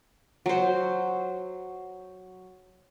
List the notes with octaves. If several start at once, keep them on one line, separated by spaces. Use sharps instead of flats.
F#3 C5